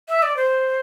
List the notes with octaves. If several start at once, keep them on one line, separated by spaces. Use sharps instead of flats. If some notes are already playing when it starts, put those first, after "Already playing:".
E5
D5
C5